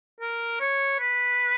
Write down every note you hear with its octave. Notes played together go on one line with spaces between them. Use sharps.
A#4
C#5
B4